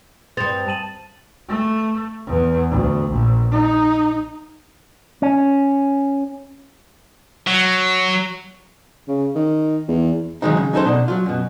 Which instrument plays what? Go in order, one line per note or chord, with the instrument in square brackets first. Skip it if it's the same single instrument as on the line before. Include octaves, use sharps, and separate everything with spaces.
[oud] G2 C4 [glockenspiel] D#6 A6 F7
[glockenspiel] A5 D#7 F#7
[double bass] A3
E2
D2
A#1
D#4
[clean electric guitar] C#4
[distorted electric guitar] F#3
[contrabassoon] C#3
D#3
E2
[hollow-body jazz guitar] D#3 F#3 G#3 C4 D#4
C#3
F#3 C#4 D#4 A4 C5
B2 D4 D#4
F#3 F4
F#2 B2